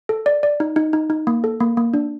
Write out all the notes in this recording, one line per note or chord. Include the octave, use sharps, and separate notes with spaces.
A4
D5
D5
D#4
D#4
D#4
D#4
A#3
A4
A#3
A#3
D4